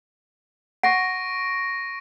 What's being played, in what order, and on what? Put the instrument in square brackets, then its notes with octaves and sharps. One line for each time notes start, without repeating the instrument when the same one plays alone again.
[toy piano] F#5 [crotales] C#6 A#6 D7